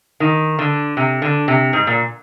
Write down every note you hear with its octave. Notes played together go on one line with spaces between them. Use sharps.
D#3
D3
C3
D3
C3
G#2
A#2